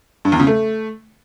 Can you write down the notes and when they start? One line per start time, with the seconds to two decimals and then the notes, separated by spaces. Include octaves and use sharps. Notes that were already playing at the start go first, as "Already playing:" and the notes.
0.25 G2
0.32 E2
0.40 C#3
0.47 A3